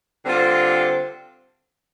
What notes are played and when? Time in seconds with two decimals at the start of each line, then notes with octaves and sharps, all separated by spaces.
0.22 D3 G3 C4 F4